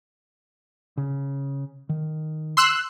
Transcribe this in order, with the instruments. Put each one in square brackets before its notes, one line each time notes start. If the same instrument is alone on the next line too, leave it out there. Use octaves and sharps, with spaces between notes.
[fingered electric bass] C#3
D#3
[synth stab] C6 E6 F#6